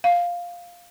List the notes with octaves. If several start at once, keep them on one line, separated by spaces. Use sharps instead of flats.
F5